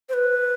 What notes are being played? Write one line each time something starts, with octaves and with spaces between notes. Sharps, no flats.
C5
B4